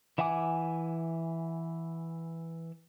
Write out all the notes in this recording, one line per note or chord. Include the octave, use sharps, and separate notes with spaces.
E3 E5 F#5 G#5 D6